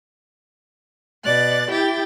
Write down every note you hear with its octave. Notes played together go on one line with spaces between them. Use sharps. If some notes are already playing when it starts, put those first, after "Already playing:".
B2 D5 F#6 A6
E4 G4 G5 A6